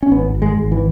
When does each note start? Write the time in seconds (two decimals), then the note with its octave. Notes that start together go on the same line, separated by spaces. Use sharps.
0.03 C#4
0.12 G#1 B3
0.35 G#1
0.42 G#3
0.57 G#1
0.72 E3